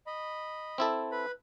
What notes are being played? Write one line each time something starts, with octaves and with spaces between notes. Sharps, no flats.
D#5 B5
C4 E4 A4
B4 B5